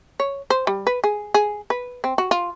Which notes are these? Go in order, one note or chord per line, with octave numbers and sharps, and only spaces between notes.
C#5
C5
G3
B4
G#4
G#4
B4
C4
F#4
F4